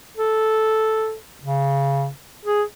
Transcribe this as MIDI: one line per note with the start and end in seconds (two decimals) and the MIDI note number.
0.17 1.15 69
1.43 2.09 49
2.45 2.63 68